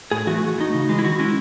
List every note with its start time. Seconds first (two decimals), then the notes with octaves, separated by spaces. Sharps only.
0.11 A2 G#4
0.27 E3 A3 F#4
0.42 E3
0.58 A3 D#4
0.74 C#3
0.89 E3 G#3
0.99 E4
1.04 D#3 F#4
1.19 G#3 C#4 E4